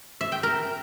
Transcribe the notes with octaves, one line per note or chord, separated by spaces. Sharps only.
E5
G5
A#4